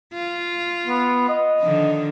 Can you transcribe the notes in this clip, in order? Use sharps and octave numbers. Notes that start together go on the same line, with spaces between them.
F4
B3
D#5
D3 D#3 F3